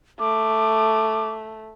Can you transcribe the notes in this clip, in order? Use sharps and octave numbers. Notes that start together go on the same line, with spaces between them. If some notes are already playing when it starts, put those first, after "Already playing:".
A3 D6